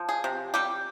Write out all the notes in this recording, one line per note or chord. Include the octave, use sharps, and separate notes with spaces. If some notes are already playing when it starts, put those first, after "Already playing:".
Already playing: F3
G#4
C3
G3 G4